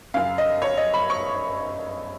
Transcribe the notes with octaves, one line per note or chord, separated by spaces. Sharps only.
F#2 C#3 F5
D#5
C#5
D#5
B5
C#6